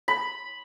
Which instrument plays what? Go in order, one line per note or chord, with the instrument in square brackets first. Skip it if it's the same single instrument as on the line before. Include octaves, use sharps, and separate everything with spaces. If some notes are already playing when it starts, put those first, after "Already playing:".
[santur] B5